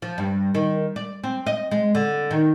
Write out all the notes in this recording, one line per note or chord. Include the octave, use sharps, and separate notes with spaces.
F3
G2
D#3
D5
C4
D#5
G#3
D3
D#3